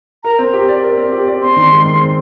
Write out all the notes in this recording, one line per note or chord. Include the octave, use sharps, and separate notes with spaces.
A#4 A#5
C4
G4
D5
A#4
C4
G4
D5
C4 C6
D#3
G#3
D#3
C4